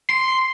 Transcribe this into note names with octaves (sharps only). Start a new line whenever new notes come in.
C6